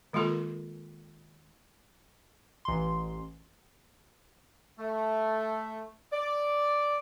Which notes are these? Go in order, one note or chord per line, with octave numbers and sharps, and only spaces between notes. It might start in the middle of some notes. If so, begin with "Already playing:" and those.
D#3 G#3 A#3 F4 A4 A#4
A1 C6
A3
D5